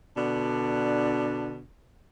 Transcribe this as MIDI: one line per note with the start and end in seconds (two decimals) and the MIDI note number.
0.16 1.61 47
0.16 1.61 50
0.16 1.61 62